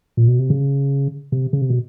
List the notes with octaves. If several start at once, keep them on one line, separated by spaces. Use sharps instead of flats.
A#2
B2
C3
C#3
C3
C#3
C3
B2